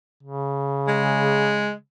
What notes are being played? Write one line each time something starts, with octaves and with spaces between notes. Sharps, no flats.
C#3
G#3